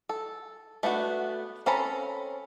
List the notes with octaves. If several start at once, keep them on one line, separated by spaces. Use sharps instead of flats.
A4
A3 B3 D4 F#4
C4 C#4 A4 A#5 B5